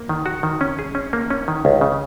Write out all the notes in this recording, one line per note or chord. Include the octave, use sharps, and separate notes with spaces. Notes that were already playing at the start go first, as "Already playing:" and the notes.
Already playing: A#3
D#3
F#4
D#3
C#4
G#4
C#4
A#3
C#4
D#3
C#2
C#3